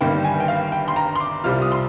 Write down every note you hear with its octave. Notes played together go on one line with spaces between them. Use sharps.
G1 G2 D#3 G3 A#3 G5
G#5
G5
F5
G5
C6
A#5
C6
D6
C2 C3 G3 C4 F4 F6
D#6
C6